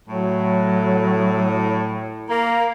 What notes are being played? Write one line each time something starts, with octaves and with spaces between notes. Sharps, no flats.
A2 F#3
A#3